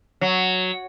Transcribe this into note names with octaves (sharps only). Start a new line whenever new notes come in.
F#3